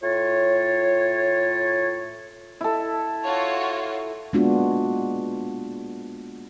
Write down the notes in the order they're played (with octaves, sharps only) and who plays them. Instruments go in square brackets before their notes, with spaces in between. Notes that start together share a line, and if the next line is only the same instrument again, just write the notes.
[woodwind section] A2 F4 C#5
[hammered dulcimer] E4 A4
[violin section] F4 F#4 C#5
[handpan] G#3 A#3 B3 D4 F4 F#4